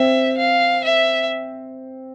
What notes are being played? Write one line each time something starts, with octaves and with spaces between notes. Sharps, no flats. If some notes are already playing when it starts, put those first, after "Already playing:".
Already playing: C4 E5
F5
E5